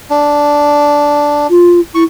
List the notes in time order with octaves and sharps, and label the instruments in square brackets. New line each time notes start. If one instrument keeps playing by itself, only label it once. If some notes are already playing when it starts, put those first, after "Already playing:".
[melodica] D4
[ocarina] F4
[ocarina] E4 [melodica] C#6